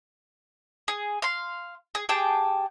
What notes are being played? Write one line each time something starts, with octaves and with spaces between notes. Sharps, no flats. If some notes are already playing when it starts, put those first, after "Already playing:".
G#4
F5 C6
G#4
G4 G#4 G5 A5